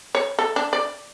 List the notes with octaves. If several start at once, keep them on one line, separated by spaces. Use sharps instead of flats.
C#5
A4
D4
D5